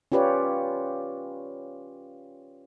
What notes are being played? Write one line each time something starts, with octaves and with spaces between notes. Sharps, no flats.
C#4 F4 G4 B4 C#5 D5